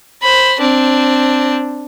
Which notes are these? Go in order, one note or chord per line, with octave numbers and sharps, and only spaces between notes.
C5 B5
C4 D4